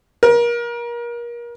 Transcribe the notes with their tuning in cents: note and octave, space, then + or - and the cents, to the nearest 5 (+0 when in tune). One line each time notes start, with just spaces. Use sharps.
A#4 +30